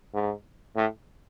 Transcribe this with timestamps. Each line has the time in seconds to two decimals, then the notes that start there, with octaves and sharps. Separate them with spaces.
0.14 G#2
0.76 A2